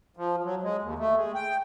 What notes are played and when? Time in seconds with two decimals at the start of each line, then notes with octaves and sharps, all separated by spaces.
0.17 F3
0.44 F#3
0.63 G#3
0.82 D#2
0.99 A3
1.16 G#3
1.34 G5